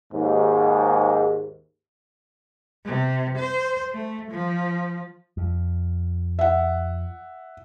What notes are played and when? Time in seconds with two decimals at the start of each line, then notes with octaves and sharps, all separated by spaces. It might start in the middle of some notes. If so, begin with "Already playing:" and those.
0.12 D#2 G#2
2.86 C3
3.38 C5
3.92 A3
4.31 F3
5.37 F2
6.39 E5 F#5